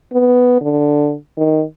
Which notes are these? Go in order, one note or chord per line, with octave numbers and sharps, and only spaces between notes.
B3
D3
D#3